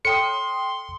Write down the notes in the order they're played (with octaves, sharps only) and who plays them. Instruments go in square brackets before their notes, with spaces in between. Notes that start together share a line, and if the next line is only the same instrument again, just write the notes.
[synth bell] A4 G5 D#6 [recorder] C6 [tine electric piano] C#7